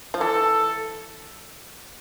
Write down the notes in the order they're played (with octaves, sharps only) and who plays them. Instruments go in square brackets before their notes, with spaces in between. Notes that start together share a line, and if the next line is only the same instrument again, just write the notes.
[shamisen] F3
[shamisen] E3 [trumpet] A4